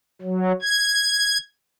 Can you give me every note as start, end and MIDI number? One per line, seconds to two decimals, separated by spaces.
0.22 0.52 54
0.62 1.38 92